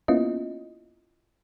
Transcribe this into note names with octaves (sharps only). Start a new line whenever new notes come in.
A#3 B3 C#4 E4 F4 D#5